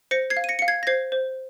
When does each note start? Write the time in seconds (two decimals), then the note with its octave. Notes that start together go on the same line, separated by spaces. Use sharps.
0.11 C5 A#6 C#7
0.30 G#6 C7
0.37 F5
0.44 D#7
0.49 A#6 C#7
0.59 F5 C#7
0.68 G#6 C7
0.83 A#6
0.87 C5 G#6 C7
1.12 C5